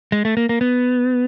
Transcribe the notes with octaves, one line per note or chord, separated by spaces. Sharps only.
G#3
A3
A#3
A#3
B3